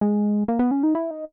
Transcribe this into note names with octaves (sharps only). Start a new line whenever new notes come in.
G#3
A#3
B3
C#4
D#4
E4
D#4